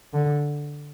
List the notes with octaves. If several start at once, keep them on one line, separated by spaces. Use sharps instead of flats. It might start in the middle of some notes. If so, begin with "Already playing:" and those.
D3